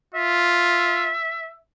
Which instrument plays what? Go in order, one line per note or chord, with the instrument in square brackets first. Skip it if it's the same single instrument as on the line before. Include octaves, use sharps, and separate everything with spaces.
[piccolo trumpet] F4 [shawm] E5